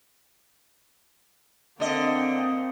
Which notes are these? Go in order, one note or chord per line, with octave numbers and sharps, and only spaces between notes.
D3 A#3 C4 D#5